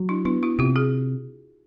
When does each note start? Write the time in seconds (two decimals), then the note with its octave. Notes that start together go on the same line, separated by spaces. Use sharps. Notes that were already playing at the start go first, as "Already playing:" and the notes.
Already playing: F#3
0.09 D4 E4
0.25 B3 D4 E4
0.43 E4 F#4
0.59 C3 F4 G4
0.76 F#4 G#4